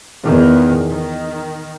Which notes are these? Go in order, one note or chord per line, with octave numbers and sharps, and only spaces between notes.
E2 D#3
D#3